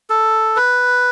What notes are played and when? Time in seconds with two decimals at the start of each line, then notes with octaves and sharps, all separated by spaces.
0.10 A4
0.56 B4